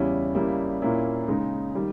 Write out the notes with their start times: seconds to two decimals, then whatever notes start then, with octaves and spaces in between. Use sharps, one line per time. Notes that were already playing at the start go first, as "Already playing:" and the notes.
Already playing: E2 C#3 G3 C#4 E4
0.35 C#3 G3 A#3 E4
0.82 A#2 A#3 C#4 E4
1.28 C#3 G#3 D#4
1.75 D#3 G3